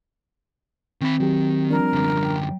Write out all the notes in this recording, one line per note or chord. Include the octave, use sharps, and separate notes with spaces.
D#3 C4 B5
D#3 F#3 G4
F3 G3 D4 A#4
F#2 D3
G5